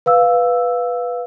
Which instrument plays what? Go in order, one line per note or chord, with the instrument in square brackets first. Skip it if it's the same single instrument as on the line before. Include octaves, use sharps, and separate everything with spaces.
[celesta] B4 F5 E6